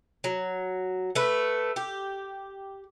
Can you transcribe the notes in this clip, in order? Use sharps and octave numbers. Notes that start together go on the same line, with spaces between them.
F#3
A3 B4
G4